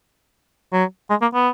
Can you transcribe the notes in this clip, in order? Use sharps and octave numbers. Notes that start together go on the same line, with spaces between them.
F#3
G#3
A#3
B3